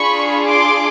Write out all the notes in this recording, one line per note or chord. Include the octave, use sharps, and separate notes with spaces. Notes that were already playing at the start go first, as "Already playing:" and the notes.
Already playing: D4 F4 G#4 B5 C#6
C6 D6